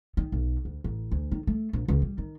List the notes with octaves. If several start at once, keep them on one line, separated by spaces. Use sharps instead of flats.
D#3
B1
D2
A1
D2
D#3
A3
A#1
C#2
G3
D#3